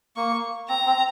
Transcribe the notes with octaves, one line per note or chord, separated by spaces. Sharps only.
A#3 C#6
C4 A#5
C4